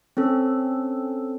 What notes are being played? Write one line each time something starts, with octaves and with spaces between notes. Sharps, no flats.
C4 C#4 A4